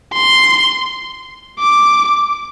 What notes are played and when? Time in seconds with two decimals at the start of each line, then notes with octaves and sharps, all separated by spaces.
0.14 C6
1.60 D6